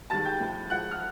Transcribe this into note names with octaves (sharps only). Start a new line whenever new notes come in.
G#2 D#3 G3 A5 A6
G5 G6
A2 F3
G#2 F3 F#5 F#6
F6